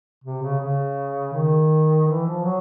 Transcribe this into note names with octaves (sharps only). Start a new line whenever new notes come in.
C3
C#3
C#3
D#3
E3
F3
F#3